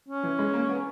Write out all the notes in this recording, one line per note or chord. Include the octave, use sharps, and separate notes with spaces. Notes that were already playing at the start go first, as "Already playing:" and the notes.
C#4
E3
G#3
A#3
B3